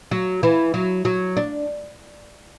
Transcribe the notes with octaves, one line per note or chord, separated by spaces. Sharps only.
F#3
E3
F#3
F#3
D4